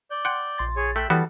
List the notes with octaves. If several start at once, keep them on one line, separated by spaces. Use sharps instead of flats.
D5 G6
F#5 G5 C6
A#1 C6 A6
G#4 C#5
A3 E5 G5 F#6
E3 G3 B3 F#4 A4